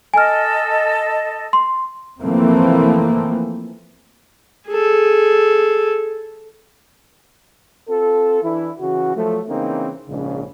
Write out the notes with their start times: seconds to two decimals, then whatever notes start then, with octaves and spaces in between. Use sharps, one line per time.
0.14 A4 D#5 G#5 F6
1.53 C6
2.21 E3 F3 A3 A#3 C4
4.69 G#4 A4
7.90 C4 F4 A4
8.43 E3 D4 E4
8.80 C#3 E3 F#4
9.16 F3 F#3 A3
9.50 C#3 E3 A#3 C4 D#4
10.08 A#1 G#2 C#3